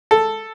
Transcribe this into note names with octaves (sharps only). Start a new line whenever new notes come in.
A4